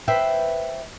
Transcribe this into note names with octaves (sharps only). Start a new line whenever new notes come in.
B4 C5 E5 G5